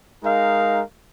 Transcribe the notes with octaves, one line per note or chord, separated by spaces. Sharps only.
G#3 D#4 A#4 F5